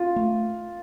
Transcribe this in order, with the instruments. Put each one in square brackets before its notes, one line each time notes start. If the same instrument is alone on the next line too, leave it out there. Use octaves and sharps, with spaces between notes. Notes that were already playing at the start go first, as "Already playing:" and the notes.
Already playing: [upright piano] F4
[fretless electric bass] A3